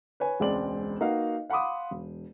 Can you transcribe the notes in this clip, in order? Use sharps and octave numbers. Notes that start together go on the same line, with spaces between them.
B4 C#5 G#5
E1 C#2 G#3 C4 D5 F#7
A#3 D#4 F#4 B4 F5 F#5
F5 F#5 B5 C6 D6 D#6
E1